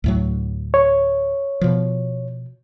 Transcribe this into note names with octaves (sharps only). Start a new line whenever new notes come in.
D2 A2 F#3
C#5
B2 F3